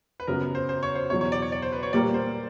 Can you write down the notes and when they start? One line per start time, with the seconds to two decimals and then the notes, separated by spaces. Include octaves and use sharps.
0.20 B4
0.27 F#2 C#3 F#3 B3 A#4
0.55 C5
0.69 C5
0.83 C#5
0.95 C5
1.10 E2 B2 F#3 C#5
1.21 C#5
1.32 D5
1.42 C#5
1.52 D5
1.62 C5
1.72 B4
1.83 C#5
1.93 A#2 G3 A#3 D5
2.14 C5